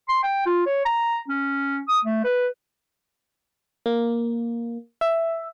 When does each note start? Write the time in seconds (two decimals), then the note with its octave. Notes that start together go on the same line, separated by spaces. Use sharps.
0.09 C6
0.23 G5
0.46 F4
0.66 C#5
0.85 A#5
1.28 C#4
1.88 D#6
2.05 A3
2.24 B4
3.86 A#3
5.01 E5